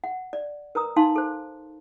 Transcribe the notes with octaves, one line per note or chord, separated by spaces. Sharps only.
F#5
D5
A#4 B4 A#5 D#6
D#4 F5 A5 C6
A4 C5